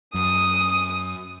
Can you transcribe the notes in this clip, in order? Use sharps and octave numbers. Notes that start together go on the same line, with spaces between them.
F#2 D#6